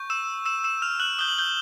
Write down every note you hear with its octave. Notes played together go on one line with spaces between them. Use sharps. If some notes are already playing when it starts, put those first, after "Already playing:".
Already playing: C#6 G6
E6 E7
E6 E7
E6 E7
F6 F7
F#6 F#7
D#6 G6 G7
F#7
G6 G7